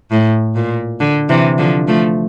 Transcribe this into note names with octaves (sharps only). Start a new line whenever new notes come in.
A2
A#2
D3
C3 E3
D3 F3
F3 A3